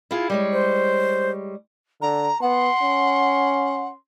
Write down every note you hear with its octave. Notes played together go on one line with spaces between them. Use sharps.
E4 F4 G#4
G3 G#3 C#5
C5
D3 A#5
B3 F#5 C6
C#4